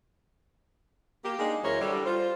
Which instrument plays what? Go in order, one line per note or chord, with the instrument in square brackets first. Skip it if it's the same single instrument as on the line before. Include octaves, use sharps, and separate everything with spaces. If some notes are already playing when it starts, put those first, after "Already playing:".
[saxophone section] A#3 G4
G#3 A#3 D4 D#4 G#4
F#2 E3 E4 A#4 C5 C#5
D3 G3
F4 C5